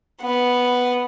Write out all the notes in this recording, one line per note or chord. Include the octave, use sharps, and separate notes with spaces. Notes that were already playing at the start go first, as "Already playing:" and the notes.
B3